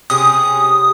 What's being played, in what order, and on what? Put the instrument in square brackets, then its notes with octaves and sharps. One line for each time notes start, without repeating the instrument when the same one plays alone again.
[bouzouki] C3 C#4 G#4 [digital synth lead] D#6